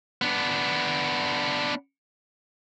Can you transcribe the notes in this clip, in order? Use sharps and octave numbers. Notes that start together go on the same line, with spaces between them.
B3 D4